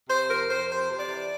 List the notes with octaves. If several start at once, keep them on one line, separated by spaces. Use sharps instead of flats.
C3 C5
F2 A#4
F2 C5
C3 C5
C3
D5
E3